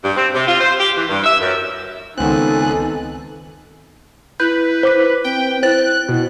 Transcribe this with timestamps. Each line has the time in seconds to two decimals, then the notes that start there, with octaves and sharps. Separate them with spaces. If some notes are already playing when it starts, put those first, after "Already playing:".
0.03 G2
0.16 C4
0.34 C3
0.47 F4
0.60 C5
0.79 G4
0.96 E3
1.09 G2
1.24 E5
1.41 F#2
2.18 C#2 D#3 B3 C4 D#4 A4 G#5 F#6
4.40 E4 B4 G6
4.83 C5 D6 B6
5.24 C4 G5
5.63 E4 C5 F#6 A6
6.09 B2